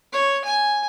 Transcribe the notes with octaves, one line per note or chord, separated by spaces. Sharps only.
C#5
G#5